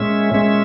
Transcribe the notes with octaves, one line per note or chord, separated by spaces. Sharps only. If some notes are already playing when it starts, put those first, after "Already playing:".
Already playing: A#2 G#3 C#4 E5
A#2 G#3 C#4